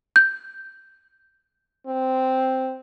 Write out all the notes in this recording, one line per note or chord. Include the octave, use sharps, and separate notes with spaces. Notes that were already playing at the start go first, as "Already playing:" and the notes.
G6
C4